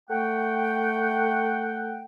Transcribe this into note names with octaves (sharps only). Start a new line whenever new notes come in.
A3 F#5 G5